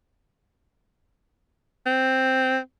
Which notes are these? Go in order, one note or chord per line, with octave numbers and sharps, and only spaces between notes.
C4